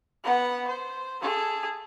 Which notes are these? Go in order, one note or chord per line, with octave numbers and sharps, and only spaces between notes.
B3 F#5
C5
G#4 A4